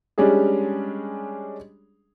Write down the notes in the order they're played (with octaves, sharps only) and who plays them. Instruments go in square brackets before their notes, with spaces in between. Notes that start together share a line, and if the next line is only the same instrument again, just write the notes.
[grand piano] G3 G#3 C#4 D4 G#4